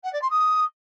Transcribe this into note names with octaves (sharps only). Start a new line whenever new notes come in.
F#5
D5
C6
D#6